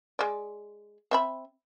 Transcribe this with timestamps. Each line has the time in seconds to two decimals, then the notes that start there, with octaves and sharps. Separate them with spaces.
0.19 G#3 D5
1.11 C4 E5 B5